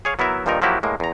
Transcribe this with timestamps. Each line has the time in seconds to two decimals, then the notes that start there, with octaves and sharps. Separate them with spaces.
0.05 G#4 C#5 F5
0.19 F#3 B3 E4 A#4 E5
0.46 G2 A#2 D#3 F3 D#4 A#4
0.62 F3 F#3 A#3 E4 F#4 G4
0.83 A2 G#3 A#3
1.00 E2 A#5